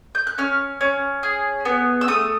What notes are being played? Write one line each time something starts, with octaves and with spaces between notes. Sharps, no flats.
G6
F#6
C#4 F6
C#4
G#4
B3
E6
A3 D#6